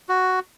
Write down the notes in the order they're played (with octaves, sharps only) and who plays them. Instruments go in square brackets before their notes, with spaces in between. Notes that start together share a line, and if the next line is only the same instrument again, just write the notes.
[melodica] F#4